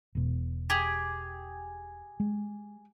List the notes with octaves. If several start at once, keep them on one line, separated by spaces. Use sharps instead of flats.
E1 B2
G4 G#4
G#3